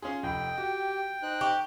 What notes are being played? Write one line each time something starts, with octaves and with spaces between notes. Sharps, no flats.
C#4 F4 G#4 C6
F1 D#5 G5 B5
F#4 G4
D#4 C5 F#6
G4 C#6